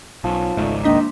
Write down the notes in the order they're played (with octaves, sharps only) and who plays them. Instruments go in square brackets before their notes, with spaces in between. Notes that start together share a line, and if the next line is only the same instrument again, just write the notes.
[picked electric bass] B1 [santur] F3 C#4
[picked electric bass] G#1 C#2 G#2 [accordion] A3 [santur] D#4 D5
[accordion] D#3 D#4 D#5 [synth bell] A#3 D4 B6 [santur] E5 C6